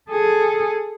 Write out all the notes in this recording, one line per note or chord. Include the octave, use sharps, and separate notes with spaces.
G#4 A4